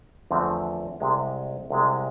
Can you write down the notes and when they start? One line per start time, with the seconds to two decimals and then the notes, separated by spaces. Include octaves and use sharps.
0.31 E2 D3 F3 A3 C4
1.00 C2 C3 G#3
1.70 C2 C3 G#3